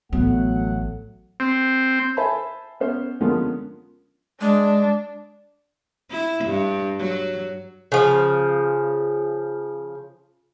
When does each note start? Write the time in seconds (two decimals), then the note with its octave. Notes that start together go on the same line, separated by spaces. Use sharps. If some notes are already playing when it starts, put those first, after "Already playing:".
0.13 A1 F#3 A3 B3 F#5
1.40 C4
2.17 C5 E5 G#5 A5 B5
2.80 B3 C#4 C5
3.20 D3 F3 G#3 A#3 B3 C#4
4.41 G#3 D4
6.10 E4
6.45 G2
6.99 F#3
7.92 C#3 F3